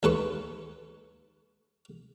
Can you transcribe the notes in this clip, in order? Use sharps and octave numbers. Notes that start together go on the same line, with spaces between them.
D#2 A4 B4 C#6